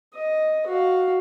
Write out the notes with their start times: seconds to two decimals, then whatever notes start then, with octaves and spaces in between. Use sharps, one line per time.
0.14 D#5
0.67 F#4 F5